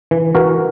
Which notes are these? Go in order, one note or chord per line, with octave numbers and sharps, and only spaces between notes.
E3
E3 F#4 A#4